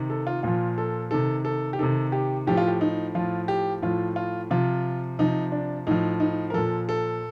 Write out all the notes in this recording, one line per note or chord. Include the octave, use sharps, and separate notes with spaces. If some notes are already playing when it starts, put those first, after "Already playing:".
Already playing: C3 D#3
A4
F4
A#2 F3 F4
A4
C3 D#3 A4
A4
G4
C3 D#3 A4
G4
A2 F3 G4
F4
G4
D#4
A2 F3 F4
G4
A2 F3 F4
F4
C3 F3 F4
C3 F3 D#4
D4
A2 F3 D#4
D#4
A#4
A#2 F3 A4
A4